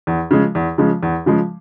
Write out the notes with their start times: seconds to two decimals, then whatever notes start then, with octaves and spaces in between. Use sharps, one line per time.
0.07 E2
0.31 C#3 F3 G#3
0.55 E2
0.78 C#3 F3 G#3
1.03 E2
1.26 C#3 F3 G#3